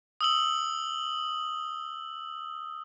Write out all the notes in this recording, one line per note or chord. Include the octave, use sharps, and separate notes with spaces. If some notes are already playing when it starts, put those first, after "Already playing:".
D#6 E6 F#7